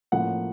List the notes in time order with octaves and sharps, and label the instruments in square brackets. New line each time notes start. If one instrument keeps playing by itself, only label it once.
[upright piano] A2 F3 A#3 C#4 F#5